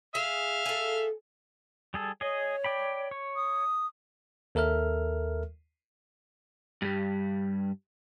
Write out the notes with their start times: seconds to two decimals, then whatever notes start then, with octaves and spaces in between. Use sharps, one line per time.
0.15 G#4 E5 F5
0.66 G#4 A4
1.94 G3 G#4 A4
2.21 G#4 C#5 D#5
2.64 D5 G5 B5
3.11 C#5
3.36 D#6
4.55 D#2 A4 A#4 E5 F6
6.82 G2 G3